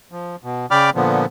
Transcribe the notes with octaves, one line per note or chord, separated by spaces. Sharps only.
F3
B2
C#3 D5 G5 B5 D6 F6
A#2 D3 F3 B3